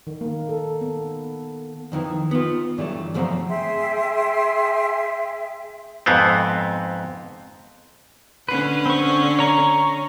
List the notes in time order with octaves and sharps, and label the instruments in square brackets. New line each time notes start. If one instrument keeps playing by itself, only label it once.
[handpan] D#3
A#3
A4
B3
[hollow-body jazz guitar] F2 D#3 E3
B3 D#4 F4
G2 E3 F#3 A3
F#2 F3 A3 C4 F#5 A#5
[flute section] G#4 E5 G5 C6
[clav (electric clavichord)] F2 G#2 B3 C4
[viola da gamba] D3 C#4 [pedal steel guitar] B4
[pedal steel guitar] C4 C#6
C#5 A#5 C#6